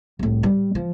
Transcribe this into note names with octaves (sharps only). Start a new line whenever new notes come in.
C2 A2
G3
F3